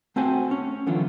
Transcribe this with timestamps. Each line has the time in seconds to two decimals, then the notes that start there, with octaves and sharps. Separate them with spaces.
0.16 A3 C4 F#4 C5 G#5
0.51 C#4
0.87 D3 E3 F#3 B3 F4